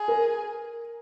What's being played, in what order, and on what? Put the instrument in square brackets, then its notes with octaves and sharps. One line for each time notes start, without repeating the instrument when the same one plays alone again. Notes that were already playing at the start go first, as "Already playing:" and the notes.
Already playing: [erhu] G#4
[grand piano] A#4